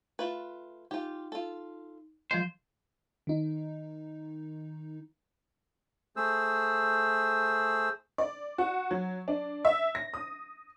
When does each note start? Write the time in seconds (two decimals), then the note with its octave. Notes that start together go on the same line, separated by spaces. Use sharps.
0.19 A3 F4 B4
0.91 D#4 F4 G4
1.32 F4 A4
2.31 F3 G#3 F4 C5
3.27 D#3 D#4
6.16 A3 G#4 C5 E6
8.18 D5
8.58 F#4
8.91 F#3
9.28 D4
9.65 E5
9.95 A#6
10.14 D#6